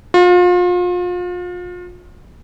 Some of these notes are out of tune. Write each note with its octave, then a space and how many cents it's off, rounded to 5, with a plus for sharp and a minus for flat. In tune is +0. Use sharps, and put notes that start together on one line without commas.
F4 +35